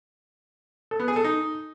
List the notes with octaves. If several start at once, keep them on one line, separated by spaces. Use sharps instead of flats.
A4
B3
G#4
A4
D#4